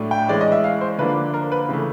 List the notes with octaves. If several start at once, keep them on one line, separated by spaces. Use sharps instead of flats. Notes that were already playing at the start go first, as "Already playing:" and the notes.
Already playing: A2 F#3 A3 D4
G5
E3 G#3 C#4 D5
D#5
E5
F5
C5
D3 F3 A#3 D4 B4
A#4
B4
C#3 E3 A3